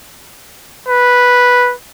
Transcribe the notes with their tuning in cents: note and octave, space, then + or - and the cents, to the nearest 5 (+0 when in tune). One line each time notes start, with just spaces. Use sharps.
B4 -5